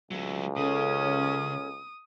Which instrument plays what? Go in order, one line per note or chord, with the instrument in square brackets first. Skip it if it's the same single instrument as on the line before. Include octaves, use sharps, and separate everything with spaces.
[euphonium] C#2 [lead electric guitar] F#3 A3
[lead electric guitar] C#3 [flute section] C#4 A4 [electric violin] D#6